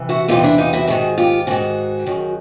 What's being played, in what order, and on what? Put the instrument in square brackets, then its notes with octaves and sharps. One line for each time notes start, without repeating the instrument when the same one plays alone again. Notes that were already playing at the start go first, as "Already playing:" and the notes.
Already playing: [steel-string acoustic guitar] C3 E3
E4 F#4
E2 C3 E3 D#4 F4
D4 E4
D#4 F4
E4 F#4
G#2 D#3 F#4 G#4
F4 G4
G#2 D#3 F#4 G#4
F#2 D#3